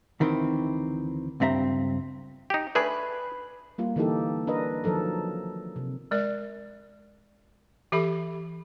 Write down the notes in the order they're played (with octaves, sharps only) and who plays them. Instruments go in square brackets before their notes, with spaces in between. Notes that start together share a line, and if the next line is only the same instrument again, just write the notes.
[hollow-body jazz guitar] D2 D#3 E3 C4
C#2 G2 C4 E5 A#5
[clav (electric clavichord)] D#4 G4
[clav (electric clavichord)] A3 D4 G#4 [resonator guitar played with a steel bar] B4
[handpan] G3 A#3 F4
D3 E3 A#3 D#4 G4 A4
D4 A#4 B4 D5 D#5
D#3 F3 F#3 A4 A#4
C3
[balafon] G#3 A#4 D5
E3 G4 A4 E5 B5